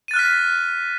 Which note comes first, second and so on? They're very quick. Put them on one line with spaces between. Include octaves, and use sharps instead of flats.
D#7 A6 F#6 F6 B6